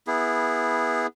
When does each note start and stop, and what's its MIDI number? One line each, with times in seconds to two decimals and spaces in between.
0.07 1.07 59
0.07 1.07 64
0.07 1.07 68